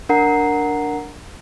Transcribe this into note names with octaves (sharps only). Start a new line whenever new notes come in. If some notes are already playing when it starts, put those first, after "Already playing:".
D4 A#4 F#5 A#5 C7